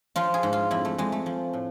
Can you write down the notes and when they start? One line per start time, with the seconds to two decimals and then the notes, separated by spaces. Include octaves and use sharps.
0.16 F3 F4
0.34 G#4
0.43 G#2
0.53 F4
0.71 F2 E4
0.85 A3
0.98 F2 G#3
1.12 A3
1.26 F3
1.53 A2